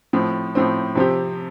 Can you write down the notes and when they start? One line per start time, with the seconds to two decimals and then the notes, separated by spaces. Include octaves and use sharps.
0.13 A2 F3 C4
0.55 A2 F3 C4
0.95 C3 F3 C4 G4